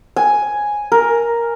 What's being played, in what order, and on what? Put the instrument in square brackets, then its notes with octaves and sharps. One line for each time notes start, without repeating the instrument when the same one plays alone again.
[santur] G#5
A#4